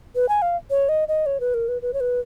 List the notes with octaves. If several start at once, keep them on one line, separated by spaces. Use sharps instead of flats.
B4
G#5
F5
C#5
D#5
D#5
C#5
B4
A#4
B4
B4
C#5
B4